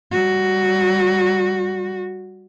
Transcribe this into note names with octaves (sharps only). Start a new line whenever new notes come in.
G3 F#4